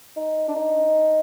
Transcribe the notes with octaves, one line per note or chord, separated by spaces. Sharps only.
D#4
D4
D#4